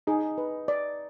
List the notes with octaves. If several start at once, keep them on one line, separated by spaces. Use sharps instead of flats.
D#4 G#4
B4
D5